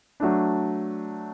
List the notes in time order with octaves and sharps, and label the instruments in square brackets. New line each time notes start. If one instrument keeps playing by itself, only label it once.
[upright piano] F#3 A3 D4